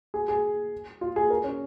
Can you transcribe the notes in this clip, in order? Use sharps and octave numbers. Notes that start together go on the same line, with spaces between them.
G#4
G#4
F4
G#4
A#4
C#4